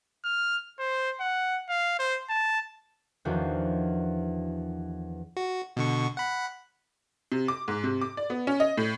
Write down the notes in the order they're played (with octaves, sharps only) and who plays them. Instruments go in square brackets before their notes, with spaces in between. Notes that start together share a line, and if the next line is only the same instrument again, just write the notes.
[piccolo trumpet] F6
C5
F#5
F5
C5
A5
[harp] E2 D#3 F3 D4 F#4 C5
[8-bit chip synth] F#4
B2 D3 C#6
F#5 B5
[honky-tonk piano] C3
D6
G#2
C3
D6
D5
B3
C#4
D#5
A2